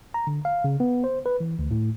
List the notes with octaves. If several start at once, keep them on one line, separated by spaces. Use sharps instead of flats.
A#5
D3
F5
C#3
B3
C5
B4
E3
D2
A2